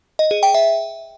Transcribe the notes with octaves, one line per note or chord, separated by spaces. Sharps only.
D#5
G#4
G5
E5